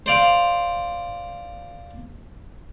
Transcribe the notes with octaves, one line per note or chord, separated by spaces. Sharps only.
C5 D5 F5